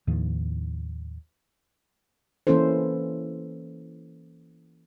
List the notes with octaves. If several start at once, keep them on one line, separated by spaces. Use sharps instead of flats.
D#2 A2 D#3 F3
E3 A#3 C#4 E4 A4 C5